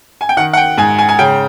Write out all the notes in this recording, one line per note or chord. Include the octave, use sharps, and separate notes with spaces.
G#5
G5
D#3 F#5
F#5
G5
G#2 G#5
G#5
G#5
C#3 G5